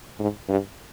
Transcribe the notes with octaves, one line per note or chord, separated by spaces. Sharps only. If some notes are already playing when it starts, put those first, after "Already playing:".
G#2
G2